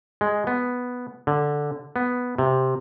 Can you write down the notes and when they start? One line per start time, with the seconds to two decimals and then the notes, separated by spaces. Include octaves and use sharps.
0.21 G#3
0.47 B3
1.27 D3
1.96 B3
2.38 C3